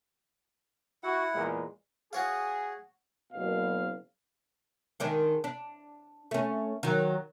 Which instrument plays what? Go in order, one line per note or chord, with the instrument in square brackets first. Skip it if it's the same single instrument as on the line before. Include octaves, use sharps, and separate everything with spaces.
[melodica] E4 F#5 [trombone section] F#4
[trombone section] E2 A#2 G#3
[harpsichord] F#4 C#5 F5 [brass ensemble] G#4
[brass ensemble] F#1 B2 F5
[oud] D#3 G#3 D4
D4
A3 C#4
D#3 F#3